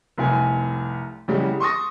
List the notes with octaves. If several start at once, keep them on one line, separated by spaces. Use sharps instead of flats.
F1 C2 G#5
E2 C#3 G3 G#3
C6 C#6 D#6 A#6